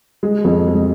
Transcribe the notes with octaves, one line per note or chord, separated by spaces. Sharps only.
G#3
F2
G#3